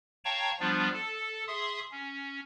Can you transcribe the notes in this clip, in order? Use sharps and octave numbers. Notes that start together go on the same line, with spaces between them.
C#5 F5 G5 A5 A#5 C#6
F3 G3 B3 D4 F4
A4 A5
G#4 E5 C6 D#6
C#4